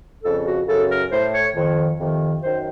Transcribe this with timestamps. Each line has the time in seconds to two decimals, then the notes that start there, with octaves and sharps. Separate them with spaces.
0.23 F2 C#3 A4
0.46 F#4
0.67 F#2 C#3 A4
0.90 A#4
1.11 A2 C5
1.34 C#5
1.55 F2 D#3
1.99 F2 C3 D#3
2.43 F#2 D#3 C5